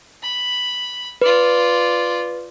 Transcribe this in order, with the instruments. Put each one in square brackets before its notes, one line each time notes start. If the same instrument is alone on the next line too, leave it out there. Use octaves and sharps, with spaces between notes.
[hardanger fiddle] B5
[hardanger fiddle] F4 D5 [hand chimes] B4